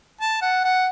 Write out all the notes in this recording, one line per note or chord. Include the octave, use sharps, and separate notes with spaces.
A5
F#5
F#5